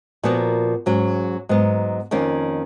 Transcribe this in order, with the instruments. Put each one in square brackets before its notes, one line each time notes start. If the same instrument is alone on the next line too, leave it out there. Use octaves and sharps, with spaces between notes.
[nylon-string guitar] A#2 F3 B3 F#4 A#4
G#2 F#3 C#4 F#4
G#2 F#3 B3
F2 D#3 A#3 C#4